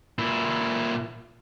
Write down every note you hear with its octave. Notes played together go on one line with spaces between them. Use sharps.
A#2 E4